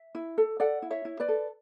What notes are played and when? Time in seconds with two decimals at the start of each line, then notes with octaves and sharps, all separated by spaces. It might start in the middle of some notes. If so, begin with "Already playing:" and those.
Already playing: E5
0.15 E4
0.38 A4
0.60 A4 D5 F#5
0.82 E4
0.91 C#5 E5
1.05 E4
1.20 B4 D5
1.28 A4